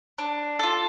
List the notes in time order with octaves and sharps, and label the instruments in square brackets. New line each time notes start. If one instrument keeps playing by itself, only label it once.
[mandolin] D4
F4 A4